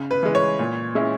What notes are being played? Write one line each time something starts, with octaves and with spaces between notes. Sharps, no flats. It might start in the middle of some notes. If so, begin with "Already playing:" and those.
Already playing: C#3
B4
E3 G#3
C#5
A#2
G#3 C#4 E4